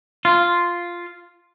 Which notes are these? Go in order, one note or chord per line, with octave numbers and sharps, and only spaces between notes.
F4